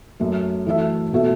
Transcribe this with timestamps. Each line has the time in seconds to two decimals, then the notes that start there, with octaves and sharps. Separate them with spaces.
0.20 F#2 F#3 A3
0.66 E3 A3 F#4 A4 E5
1.12 B2 A3 F#4 A4 E5